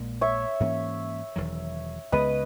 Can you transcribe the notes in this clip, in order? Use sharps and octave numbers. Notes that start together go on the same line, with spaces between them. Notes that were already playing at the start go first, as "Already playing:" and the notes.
Already playing: A#1 A#2 G#3
C#5 E5
G#2 E3 A#3 C#4
E1 E2 D#3 F#3
C#2 C#3 G#3 B3 B4 D#5